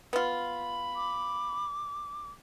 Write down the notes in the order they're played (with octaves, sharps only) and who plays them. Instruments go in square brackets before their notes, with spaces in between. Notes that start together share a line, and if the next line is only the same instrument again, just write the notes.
[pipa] B3 F4 [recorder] B5
[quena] D6